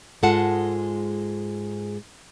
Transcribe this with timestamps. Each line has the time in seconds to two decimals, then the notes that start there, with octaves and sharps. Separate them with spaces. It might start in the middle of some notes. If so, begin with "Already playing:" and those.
0.22 G#2 G#3 F4 A4 F#5 A5